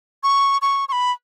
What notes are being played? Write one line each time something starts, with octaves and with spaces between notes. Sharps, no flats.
C#6
C#6
C#6
B5